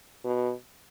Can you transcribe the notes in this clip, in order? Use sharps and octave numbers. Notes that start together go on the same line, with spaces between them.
B2